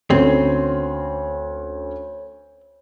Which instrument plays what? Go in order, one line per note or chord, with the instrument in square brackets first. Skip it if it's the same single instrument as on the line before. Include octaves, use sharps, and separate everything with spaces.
[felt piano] D2 C#4 [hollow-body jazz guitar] C4 [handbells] C#5